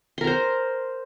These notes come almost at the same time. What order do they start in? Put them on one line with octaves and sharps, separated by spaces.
C6 A#4 A#5 C5